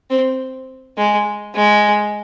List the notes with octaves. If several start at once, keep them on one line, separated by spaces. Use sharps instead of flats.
C4
G#3
G#3